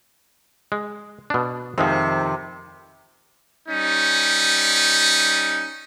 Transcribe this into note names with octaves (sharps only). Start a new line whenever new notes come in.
G#3
B2 D4
F2 C3 D#3 F3 G#3 C4
G3 C#4 D#4